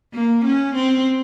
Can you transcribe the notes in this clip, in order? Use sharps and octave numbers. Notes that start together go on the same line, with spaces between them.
A#3
C#4
C4